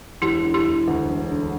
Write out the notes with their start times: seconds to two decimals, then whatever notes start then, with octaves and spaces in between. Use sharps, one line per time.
0.21 E1 E4 G4
0.44 D3
0.54 E4 G4
0.66 E1
0.88 D2
1.09 E1
1.31 D3